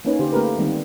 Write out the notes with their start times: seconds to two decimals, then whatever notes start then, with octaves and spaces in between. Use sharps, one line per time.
0.05 A#3 B3 C#4 D#4 B4 C#5
0.19 D3 G4 C5
0.32 A3 A#3 C#4 G4 A#4 B4
0.59 D#3 G3 G#3 B3 C4